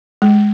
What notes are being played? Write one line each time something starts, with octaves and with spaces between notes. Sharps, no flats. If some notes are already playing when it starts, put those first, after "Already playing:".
G#3